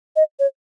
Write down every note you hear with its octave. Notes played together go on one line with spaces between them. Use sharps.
D#5
C#5